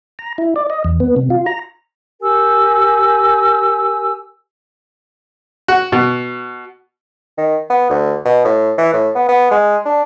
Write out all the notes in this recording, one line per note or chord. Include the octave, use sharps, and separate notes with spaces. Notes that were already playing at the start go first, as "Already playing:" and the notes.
A#5
E4
D5
D#5
E2
B3
C3
F4
A#5
G4 A#4 G#5 E6
F#4
B2
D#3
B3
D2
B2
A2
E3
A2
B3
B3
G#3
D4